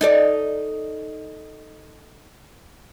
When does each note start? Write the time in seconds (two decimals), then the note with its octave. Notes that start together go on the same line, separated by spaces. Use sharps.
0.01 D#4 A4 D5